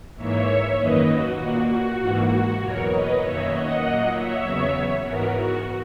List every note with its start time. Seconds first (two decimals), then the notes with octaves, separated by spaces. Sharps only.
0.16 G#2 E3 A#3 C#5 E5
0.76 F#2 D#3 A#3 B4 D#5
1.07 F#4
1.37 A#2 A#3 F#4
1.67 F#4
1.98 G#2 E3 A#3
2.28 F#4
2.58 E2 B2 F#3 A#4 C#5
2.89 B4 D#5
3.19 F#2 D#3 A#3 C#5 E5
3.49 D#5 F#5
3.80 A#2 F#3 A#3
4.10 C#5 E5
4.41 E2 C#3 F#3 B3
5.01 G#2 E3 B3 F#4 A#4
5.32 F#4